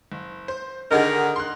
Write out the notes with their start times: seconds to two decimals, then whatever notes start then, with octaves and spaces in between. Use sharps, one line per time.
0.12 F#1
0.48 C5
0.91 D3 D#3 D#4 F#4 G#4 A#4
1.36 C6 F#6